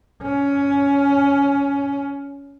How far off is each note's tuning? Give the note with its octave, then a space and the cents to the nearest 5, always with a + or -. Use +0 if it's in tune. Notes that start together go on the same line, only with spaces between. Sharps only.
C#4 +15